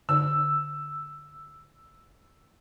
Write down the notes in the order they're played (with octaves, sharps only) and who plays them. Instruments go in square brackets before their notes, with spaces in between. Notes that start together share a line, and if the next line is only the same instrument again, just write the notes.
[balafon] D3 [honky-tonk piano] E6